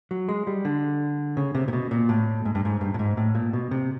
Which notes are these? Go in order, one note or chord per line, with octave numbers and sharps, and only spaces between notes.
F#3
G#3
G3
D3
C#3
C3
A#2
B2
A#2
A2
G#2
G2
G#2
G2
A2
G#2
A2
A#2
B2
C3